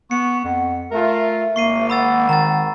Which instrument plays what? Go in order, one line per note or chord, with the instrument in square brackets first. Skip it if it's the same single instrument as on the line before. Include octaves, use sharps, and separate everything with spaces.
[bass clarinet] B3 [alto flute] C#6 [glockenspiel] C#7
[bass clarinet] F2 [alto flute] F#5
[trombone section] A3 F4 [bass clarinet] A#4 [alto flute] E5
[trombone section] G#1 [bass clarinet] A#3 [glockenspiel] C#6 C7 D#7
[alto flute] F#5 [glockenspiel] B5 E6 A6
[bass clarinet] D#3 [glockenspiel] A#5 A6